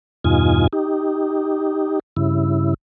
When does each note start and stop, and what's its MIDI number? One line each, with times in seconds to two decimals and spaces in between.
0.24 0.67 40
0.24 0.67 43
0.24 0.67 47
0.24 0.67 63
0.24 0.67 65
0.24 0.67 80
0.73 2.00 63
0.73 2.00 67
2.17 2.74 43
2.17 2.74 49
2.17 2.74 64